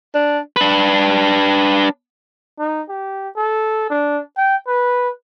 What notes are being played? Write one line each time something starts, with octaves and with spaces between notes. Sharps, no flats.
D4
D4 B4
D#4
G4
A4
D4
G5
B4